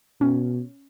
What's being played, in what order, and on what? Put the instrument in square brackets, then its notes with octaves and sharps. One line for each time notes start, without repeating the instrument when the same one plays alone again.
[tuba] B2 [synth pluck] C#4